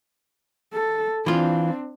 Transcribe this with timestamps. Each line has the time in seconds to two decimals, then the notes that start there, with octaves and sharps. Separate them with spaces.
0.73 A4
1.26 E3 C4 D4 F4